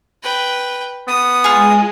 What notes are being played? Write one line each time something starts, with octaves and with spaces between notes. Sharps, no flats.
B4 G5
B3 D#6
G#3 F4 G#4